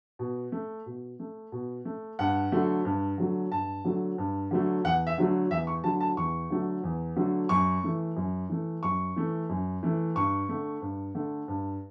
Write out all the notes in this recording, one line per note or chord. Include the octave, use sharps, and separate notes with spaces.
B2
A3
B2
A3
B2
A3
G2 F#5
D3 F#3 A3
G2
D3 F#3 A3
G2 A5
D3 F#3 A3
G2
D3 F#3 A3
E2 F#5
E5
D3 F#3 A3
E2 E5
C#6
D3 F#3 A3 A5
A5
E2 C#6
D3 F#3 A3
E2
D3 F#3 A3
F#2 C#6
E3 A3
F#2
E3 A3
F#2 C#6
E3 A3
F#2
E3 A3
G2 C#6
D3 A3
G2
D3 A3
G2